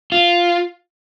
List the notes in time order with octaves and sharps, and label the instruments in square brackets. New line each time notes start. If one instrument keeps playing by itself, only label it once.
[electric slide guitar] F4